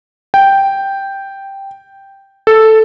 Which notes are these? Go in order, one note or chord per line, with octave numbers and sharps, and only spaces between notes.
G5
A4